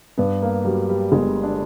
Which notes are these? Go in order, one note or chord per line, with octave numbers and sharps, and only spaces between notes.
G2 B3
A#3
F#3 G3
G3
G1 G#3
D4